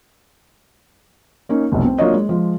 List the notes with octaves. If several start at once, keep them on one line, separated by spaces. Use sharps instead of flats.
A#3 C#4 D#4
F1 B1
C4
F#3 A#3 D4 F4 C#5 D#5
G#3
F3 G#3